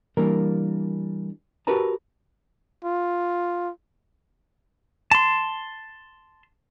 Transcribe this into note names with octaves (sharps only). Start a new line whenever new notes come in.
E3 G3 A#3 D4 A#4
F#4 G4 A#4 B4 A5 A#5
F4
A5 C6